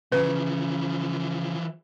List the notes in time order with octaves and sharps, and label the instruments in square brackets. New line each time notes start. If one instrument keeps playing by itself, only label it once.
[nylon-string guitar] C#3 [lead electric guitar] E3 F3 [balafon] B4